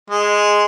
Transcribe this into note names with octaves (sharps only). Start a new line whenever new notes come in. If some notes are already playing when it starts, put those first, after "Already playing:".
G#3